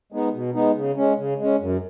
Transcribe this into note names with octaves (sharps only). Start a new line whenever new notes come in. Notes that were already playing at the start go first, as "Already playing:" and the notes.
G#3 B3 D#4
B2
G#3 B3 D#4
C#3
G#3 C#4
C#3
G#3 C#4
F#2